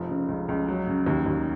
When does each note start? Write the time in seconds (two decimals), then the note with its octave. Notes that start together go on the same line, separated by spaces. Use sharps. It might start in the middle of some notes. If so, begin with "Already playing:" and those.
Already playing: F1 F3
0.09 C#3
0.28 C#2
0.49 C#2
0.68 F#3
0.87 C#3
1.06 D#2
1.26 D#2